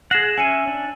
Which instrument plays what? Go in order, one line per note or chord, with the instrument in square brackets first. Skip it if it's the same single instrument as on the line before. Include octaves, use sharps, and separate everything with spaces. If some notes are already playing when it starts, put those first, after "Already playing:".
[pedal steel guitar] G#4 F#5 [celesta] A#6 C7 E7
[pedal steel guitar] C#4 E5 [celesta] G#5 C#7 D#7
[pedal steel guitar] D4